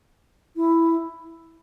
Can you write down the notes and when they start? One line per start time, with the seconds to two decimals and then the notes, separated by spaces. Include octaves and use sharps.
0.56 E4